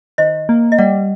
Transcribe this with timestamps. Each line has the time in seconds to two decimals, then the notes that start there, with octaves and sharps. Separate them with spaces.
0.18 D#3 C5 D#5
0.49 A#3
0.72 D#5
0.78 G3 D5 F#5